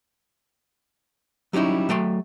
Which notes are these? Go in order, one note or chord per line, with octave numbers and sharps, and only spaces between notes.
F#3 G3 C#4 D#4 E4
F#3 A3 G5 C6